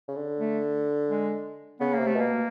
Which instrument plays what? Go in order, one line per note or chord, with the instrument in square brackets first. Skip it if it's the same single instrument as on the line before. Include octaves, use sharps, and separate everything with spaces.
[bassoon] C#3
D3
[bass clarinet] A3
G#3
[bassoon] C#3 [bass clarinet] B3
[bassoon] C3 [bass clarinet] A#3
[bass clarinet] A3
[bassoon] B2 [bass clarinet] A#3